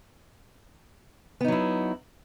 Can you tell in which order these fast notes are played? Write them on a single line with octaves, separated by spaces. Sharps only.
B3 D#4 F#3 E4